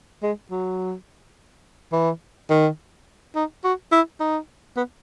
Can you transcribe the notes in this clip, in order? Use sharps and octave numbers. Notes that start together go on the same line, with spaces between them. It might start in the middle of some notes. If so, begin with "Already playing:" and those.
G#3
F#3
E3
D#3
D#4
F#4
E4
D#4
B3